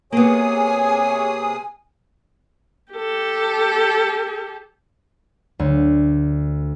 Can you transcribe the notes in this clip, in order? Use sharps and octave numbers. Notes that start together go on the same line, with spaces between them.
C3 A#3 B3 G#4 C#5 G#5 D#6
G4 A4
D2